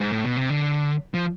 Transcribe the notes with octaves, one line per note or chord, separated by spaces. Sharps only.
G#2
A2
B2
C3
D3
F3